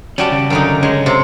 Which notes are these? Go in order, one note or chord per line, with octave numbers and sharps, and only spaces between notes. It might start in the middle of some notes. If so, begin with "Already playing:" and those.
G3 C#4 F#4 D5 A5
C#3
F#2 D3 D#4
C#3 G#3 C#4
C3